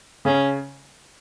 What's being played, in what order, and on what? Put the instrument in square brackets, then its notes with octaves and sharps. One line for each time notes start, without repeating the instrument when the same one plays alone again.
[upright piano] C#3 [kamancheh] C#4